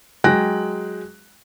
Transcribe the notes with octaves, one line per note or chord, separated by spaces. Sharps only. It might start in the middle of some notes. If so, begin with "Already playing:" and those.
F#3 G#3 G5 F#6 A#6